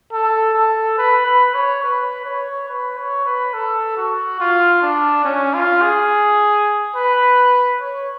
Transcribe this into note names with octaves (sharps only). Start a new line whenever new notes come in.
A4
A4
B4
B4
C#5
B4
C#5
B4
C#5
B4
A4
F#4
F4
D4
C#4
F4
G#4
B4
C#5